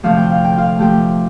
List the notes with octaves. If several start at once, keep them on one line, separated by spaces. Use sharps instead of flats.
D2 C3 F3 A3 F5
G5
F5
G5
F4 F5
F3 A3 G4 G5